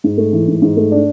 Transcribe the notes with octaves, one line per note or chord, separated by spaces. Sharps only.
G#2
A3
E3
G#2
G#2
A3
D4